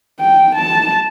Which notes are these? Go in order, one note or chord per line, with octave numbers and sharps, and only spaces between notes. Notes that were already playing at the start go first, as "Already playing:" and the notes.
G5
A5